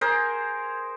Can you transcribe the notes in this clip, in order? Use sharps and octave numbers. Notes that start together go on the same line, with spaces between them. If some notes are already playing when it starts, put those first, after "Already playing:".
G#4 A#4 C5